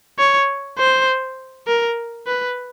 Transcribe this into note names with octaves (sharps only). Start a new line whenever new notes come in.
C#5
C5
A#4
B4